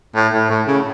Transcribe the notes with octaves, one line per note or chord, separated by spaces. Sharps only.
A2
A2
A2
C#3